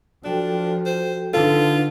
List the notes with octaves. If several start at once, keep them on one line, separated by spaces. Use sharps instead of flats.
F3 D4 F#4 A4 G5
C5
D3 D4 D#4 F4 A4 B4